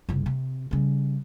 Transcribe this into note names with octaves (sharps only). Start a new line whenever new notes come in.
F#1 C2
C3
C#3 G3